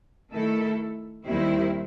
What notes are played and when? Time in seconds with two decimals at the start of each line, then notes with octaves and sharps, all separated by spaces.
0.30 D#3 A3 E4 A4
1.25 D#2 D#3 G3 C4 E4